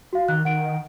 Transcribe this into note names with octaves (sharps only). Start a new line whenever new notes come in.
F#4 F5
D#3 F#6
D#3 F#5 D7